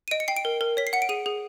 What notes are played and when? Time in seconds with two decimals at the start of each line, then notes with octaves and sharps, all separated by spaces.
0.08 D#7
0.11 D#5 D7
0.20 C#7
0.28 G5 C7
0.37 D7
0.45 A#4
0.61 A#4
0.77 C#5 B6
0.87 C7
0.93 F#5 C#7
1.02 D7
1.09 G#4 D#7
1.26 G#4